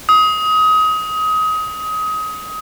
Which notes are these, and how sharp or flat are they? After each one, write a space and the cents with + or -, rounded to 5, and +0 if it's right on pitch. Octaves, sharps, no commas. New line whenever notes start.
D#6 +25